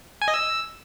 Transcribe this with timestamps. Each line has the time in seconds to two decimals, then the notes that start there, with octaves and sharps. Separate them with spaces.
0.22 G#5
0.28 D#5
0.34 E6